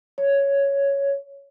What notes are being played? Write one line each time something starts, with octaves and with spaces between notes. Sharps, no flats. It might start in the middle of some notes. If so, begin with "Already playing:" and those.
C#5